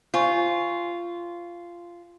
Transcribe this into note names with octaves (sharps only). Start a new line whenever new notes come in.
F4 C5 G#5 C#6